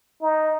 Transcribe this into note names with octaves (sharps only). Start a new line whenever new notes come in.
D#4